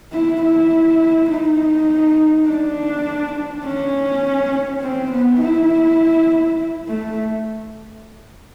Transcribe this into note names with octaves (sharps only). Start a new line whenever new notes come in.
E4
E4
D#4
D4
C#4
C4
B3
E4
A3